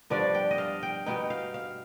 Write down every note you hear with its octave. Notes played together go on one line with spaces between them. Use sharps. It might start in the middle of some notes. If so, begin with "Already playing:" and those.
G2 F3 B3 D4 D5
G5
D#5
F5
G5
B2 B3 D#4 G5
F5
F5